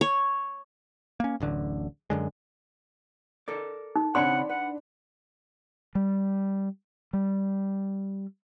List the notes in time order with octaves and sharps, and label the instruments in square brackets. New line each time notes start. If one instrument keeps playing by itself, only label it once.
[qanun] C#5
[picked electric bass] A#3 C#4
D1 A1 D3
F#2 D3 G#3
[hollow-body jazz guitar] A4 A#4 D5
[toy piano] D#4
[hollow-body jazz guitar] C#3 C4 C#5 [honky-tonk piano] D4 B5 C#7 [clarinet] F#5 [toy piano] C6
[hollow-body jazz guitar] B4 [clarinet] F#5
[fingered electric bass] G3
G3